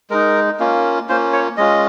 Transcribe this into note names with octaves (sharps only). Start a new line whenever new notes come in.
G#3 D#4 A#4
A#3 C#4 F4
A#3 C#4 F4 C5
C#5
G#3 C#4 F4 D#5